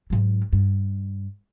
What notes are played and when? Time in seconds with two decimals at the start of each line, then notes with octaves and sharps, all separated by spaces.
0.10 G#2 F#3
0.53 G2